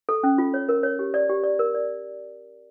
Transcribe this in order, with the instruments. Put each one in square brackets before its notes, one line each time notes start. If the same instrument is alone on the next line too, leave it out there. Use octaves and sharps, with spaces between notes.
[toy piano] A4
C#4
F4
C#5
A#4
C#5
G4
D5
G4
D5
A#4
D5